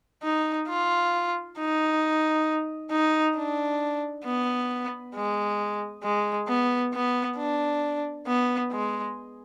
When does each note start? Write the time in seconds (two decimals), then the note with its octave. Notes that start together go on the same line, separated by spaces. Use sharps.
0.23 D#4
0.68 F4
1.58 D#4
2.91 D#4
3.37 D4
4.25 B3
5.15 G#3
6.03 G#3
6.48 B3
6.94 B3
7.38 D4
8.27 B3
8.72 G#3